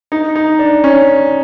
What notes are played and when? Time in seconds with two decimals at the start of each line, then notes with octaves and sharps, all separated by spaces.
0.12 D#4
0.35 D#4
0.59 D4
0.84 C#4